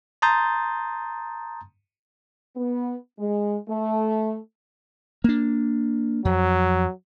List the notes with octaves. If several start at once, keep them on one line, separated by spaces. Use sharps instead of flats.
A5 A#5 C6 D#6 G6 A6
B3
G#3
A3
A#3 D4
F2 F#3